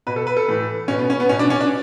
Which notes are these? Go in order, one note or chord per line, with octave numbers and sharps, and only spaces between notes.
B2 B4
A4
B4
A4
A2 E3
B2 C#4
B3
C#4
B3
B2 C#4
D4
C#4
D4